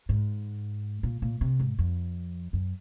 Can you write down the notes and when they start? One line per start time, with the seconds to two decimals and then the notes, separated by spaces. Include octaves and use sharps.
0.09 G#2
1.03 A#2
1.22 A#2
1.41 C3
1.59 G#2
1.79 F2
2.53 F#2